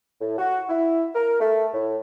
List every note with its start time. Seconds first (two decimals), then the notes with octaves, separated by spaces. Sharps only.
0.21 A2
0.38 F#4
0.69 E4
1.15 A#4
1.40 A3
1.74 A2